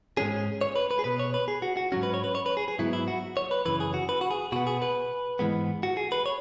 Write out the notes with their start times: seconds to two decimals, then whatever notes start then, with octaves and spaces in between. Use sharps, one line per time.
0.17 G#2 G#3 C#4 G#4
0.61 C#5
0.76 B4
0.91 B4
0.99 G#4
1.04 B2 B3 B4
1.19 C#5
1.34 B4
1.48 G#4
1.62 F#4
1.77 F#4
1.92 G#2 F#3 C#4 F#4
2.03 B4
2.14 C#5
2.24 B4
2.35 C#5
2.46 B4
2.57 G#4
2.68 G#4
2.79 G#2 F#3 B3 E4
2.93 E4
3.08 F#4
3.37 C#5
3.51 B4
3.65 F#2 C#3 E3 B4
3.80 G#4
3.94 F#4
4.09 B4
4.21 F#4
4.31 G#4
4.52 B2 B3 F#4
4.67 G#4
4.82 B4
5.39 G#2 E3 G#3 B3
5.83 F#4
5.97 G#4
6.12 B4
6.26 C#5